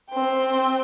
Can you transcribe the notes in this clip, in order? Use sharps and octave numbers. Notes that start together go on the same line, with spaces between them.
C4 G5